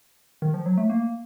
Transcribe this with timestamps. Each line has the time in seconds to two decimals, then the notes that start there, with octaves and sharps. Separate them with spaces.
0.42 D#3
0.54 F3
0.66 F#3
0.78 A3
0.90 A#3